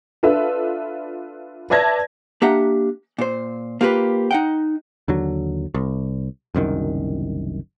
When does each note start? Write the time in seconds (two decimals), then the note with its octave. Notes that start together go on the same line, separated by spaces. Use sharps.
0.23 D4 F4 A4 B4 E5
1.70 B4 D5 E5 A5 G#6 A#6
2.42 A#3 D4 G4 E5 F#5 A#5
3.18 A#2 C5
3.81 A#3 F4 G4 A#4 B4
4.31 D#4 F#5 G5
5.08 D#2 D3 F#3
5.74 C2
6.54 F#1 C2 F#2 D#3